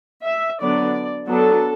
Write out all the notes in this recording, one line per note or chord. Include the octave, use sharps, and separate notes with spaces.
E5
D3 F#3 B3 D4 D5
F#3 B3 D4 A4